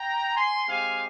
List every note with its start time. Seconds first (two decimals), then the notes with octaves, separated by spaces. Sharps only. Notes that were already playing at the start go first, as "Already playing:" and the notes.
Already playing: G5 A#5
0.36 G#5 C6
0.67 G#3 C4 G4 F5 G#5